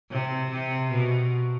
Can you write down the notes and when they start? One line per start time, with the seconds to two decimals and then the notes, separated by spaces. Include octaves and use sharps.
0.11 C3
0.51 C3
0.91 B2